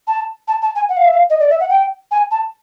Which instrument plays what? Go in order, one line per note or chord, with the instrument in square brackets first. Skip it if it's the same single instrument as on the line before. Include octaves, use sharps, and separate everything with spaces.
[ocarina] A5
A5
A5
G#5
F#5
F5
E5
F5
D#5
D5
E5
F#5
G5
G#5
A5